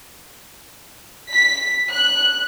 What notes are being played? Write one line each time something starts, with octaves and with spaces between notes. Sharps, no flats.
B6
F#6